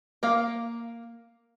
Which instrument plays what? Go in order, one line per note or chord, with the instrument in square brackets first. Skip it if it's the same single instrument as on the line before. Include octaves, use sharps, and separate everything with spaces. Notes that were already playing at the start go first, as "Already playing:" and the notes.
[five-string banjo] A#3 F5